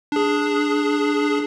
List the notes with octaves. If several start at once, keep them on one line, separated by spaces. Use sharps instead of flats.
D4 G#4